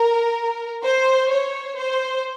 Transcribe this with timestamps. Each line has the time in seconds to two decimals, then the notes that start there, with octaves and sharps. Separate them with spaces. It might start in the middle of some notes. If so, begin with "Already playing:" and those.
Already playing: A#4
0.84 C5
1.30 C#5
1.77 C5